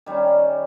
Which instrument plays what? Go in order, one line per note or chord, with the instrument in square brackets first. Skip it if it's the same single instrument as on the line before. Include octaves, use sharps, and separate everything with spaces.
[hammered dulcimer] D#3 G3 C#4